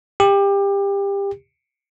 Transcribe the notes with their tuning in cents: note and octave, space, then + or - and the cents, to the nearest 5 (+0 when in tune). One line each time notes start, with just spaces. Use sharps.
G4 +25